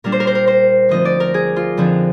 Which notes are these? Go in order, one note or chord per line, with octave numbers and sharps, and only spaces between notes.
A#2 G3 D4 A#4
C5
A#4
C5
A#4
C5
D2 D3 F3 C4 D#4 D#5
D5
A#4
G#4
F4
F2 D3 F3 C4 D#4